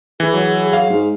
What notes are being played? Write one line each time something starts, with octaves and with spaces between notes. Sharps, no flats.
E3 G#4
F#3
F5
G#2